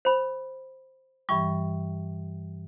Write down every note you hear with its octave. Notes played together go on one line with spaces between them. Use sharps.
C5 B5
G2 E3 G3 C#6